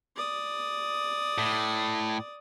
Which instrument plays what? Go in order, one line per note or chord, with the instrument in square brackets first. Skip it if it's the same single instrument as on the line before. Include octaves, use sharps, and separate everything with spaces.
[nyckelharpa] D5 D#6
[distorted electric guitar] A2